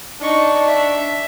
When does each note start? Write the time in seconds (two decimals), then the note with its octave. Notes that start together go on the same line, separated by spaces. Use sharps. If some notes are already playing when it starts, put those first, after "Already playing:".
0.21 D4 D#4 C#6
0.66 E5